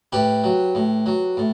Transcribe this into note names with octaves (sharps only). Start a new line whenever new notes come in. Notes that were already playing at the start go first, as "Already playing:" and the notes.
A2 G4 B4
F#3
A2
F#3
A2